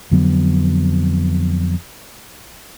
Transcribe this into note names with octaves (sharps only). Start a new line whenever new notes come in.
F2 D3 F#3 B3